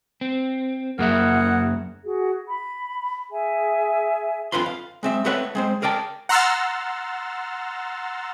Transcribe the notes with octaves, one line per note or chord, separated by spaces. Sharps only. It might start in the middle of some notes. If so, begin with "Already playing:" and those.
C4
F#2 A#3 G#4 A#4 E5 F#5
F#4 G#4
B5
G#4 E5 G#5
F2 D3 F4 B4 B5 C6
F5
G#3 C4 E5
A3 C4 A4 B4 C#5 F#5
G#3 C4 C5
G#4 A#4 D5 G5 A5
F#5 A#5 C6 E6 F6 A6